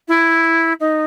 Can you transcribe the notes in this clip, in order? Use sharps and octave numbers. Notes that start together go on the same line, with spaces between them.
E4
D#4